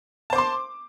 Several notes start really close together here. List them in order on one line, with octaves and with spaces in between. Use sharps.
A5 C5 D6 C6